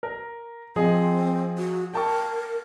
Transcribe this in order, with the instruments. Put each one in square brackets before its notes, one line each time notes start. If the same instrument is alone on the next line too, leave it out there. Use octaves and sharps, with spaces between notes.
[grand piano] A#4
[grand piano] F3 G#4 D#5 [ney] C4
[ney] F#4
[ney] A#4 [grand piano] G5 A5 C#6